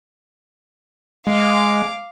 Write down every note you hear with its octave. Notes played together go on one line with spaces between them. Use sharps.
G#3 F5 D6